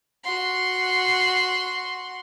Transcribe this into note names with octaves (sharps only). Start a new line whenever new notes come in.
F#4 C6